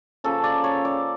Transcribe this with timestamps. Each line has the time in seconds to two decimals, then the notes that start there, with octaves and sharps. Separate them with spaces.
0.24 C#3 F3 A#3 C#4 A4
0.44 D5
0.64 C#5
0.85 D5